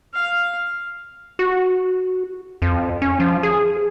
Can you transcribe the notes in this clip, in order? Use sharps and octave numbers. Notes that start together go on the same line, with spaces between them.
F5
F#4
F2
C#4
F3
G#4